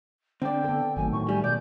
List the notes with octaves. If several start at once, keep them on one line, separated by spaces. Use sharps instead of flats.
D3 C4 D5 G5
B3 A4
G#1 D#3 F#3 A3 G#5
A2 C#6
G3 G#5
B2 D5 G6